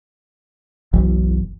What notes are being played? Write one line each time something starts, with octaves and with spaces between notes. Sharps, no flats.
F#1 B1 E3